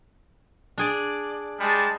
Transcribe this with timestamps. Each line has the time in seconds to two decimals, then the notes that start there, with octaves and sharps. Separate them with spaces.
0.78 D4 G#4 D5
1.60 G3 G#3 A5